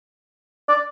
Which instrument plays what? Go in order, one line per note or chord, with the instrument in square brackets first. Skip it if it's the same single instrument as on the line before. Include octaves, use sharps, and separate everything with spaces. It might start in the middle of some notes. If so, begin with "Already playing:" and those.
[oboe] D5